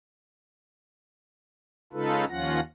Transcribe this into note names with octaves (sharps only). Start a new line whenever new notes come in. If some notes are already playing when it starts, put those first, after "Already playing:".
C#3 G#3 D#4 F4 A4 B4
D#2 F3 C#4 F4 F#5 A#6